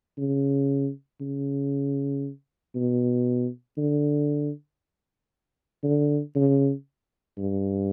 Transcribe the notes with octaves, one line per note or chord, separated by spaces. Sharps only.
C#3
C#3
B2
D3
D3
C#3
G2